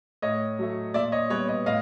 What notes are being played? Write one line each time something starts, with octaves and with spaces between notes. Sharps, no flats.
A2 C#5 D#5
F#3 A3
A#2 D5 E5
C#5 D#5
G3 B3 B4 C#5
C#5 D#5
A2 D#5 F5